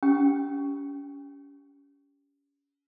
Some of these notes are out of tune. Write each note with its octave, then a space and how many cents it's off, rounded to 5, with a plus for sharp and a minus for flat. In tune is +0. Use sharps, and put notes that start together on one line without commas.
C#4 +35 G4 +0 G5 +0